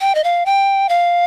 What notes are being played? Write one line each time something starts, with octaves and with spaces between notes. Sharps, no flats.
G5
D#5
F5
G5
F5